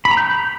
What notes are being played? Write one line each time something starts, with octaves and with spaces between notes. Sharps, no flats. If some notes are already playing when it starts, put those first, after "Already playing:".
B5
A#5
G6